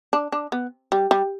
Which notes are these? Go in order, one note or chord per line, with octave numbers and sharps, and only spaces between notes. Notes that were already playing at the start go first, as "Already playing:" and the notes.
D4
D4
B3
G3
G3